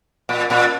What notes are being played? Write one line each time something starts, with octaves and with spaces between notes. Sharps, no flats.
A#2
A#2